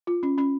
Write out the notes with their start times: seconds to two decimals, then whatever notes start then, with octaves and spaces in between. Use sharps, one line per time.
0.07 F4
0.23 C#4
0.38 C#4